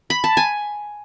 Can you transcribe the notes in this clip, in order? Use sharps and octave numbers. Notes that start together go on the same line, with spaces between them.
B5
A5
G#5